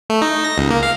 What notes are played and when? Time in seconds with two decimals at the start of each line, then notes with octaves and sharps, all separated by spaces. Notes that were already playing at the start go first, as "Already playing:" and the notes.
0.10 A3
0.22 D#4
0.44 A#6
0.58 C#2
0.71 A#3
0.83 F5